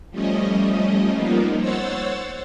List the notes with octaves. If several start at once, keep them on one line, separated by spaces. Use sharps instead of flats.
F3 G3 A3 C#4 D#5
F3 G3 A#3 B3 D#4 F4
C5 C#5 F#5 E6 A6